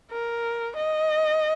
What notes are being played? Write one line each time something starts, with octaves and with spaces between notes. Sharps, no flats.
A#4
D#5